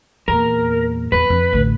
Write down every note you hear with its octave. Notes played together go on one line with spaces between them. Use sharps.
E2 A#2 A#4
E2 F#3 B4
F2
A1 D2